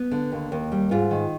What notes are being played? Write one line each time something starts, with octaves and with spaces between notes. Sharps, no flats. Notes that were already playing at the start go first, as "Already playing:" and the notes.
Already playing: B3
D3
D#2
D#2
G3
G#2 F4
D#3